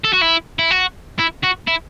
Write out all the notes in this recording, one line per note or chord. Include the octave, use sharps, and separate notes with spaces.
A4
F#4
E4
E4
F#4
E4
F#4
E4